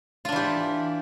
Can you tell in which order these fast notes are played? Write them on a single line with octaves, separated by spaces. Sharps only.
F4 D4 E3 G4